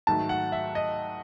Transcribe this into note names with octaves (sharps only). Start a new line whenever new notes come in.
G#2 D#3 F#3 A3 A5
F#5
E5
D#5